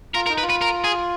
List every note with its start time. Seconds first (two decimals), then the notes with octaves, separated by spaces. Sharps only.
0.15 F4 A#4
0.27 A#4
0.29 D#4
0.38 B4
0.42 F4
0.50 B4
0.61 A#4
0.84 G#4